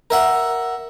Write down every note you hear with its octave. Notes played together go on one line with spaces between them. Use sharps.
A#4 E5 F#5